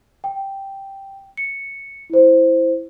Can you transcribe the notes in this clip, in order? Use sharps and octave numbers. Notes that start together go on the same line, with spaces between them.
G5
C#7
E4 C5